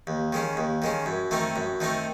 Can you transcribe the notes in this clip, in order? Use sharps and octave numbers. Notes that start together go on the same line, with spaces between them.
D#2
D#3 G#3 C#4
D#2
D#3 G#3 C#4
F#2
D#3 A3 C4 D#4
F#2
D#3 A3 C4 D#4